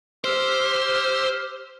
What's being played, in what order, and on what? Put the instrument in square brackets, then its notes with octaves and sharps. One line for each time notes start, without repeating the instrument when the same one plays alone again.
[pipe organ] G4 E6 F6 [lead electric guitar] C5